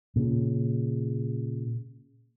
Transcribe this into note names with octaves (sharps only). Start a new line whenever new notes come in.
A#2 C#3